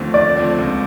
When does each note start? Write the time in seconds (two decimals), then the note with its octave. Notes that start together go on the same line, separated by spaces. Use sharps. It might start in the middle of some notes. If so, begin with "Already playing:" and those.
Already playing: D#2 D3 F3 A3 C4
0.14 D#2 D5
0.36 D3 F3 A3 C4
0.58 C#2